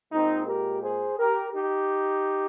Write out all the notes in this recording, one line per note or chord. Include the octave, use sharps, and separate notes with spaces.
A#2 G#3 C4 D#4
G4 A#4
G#4 C5
G4 A#4
D#4 G4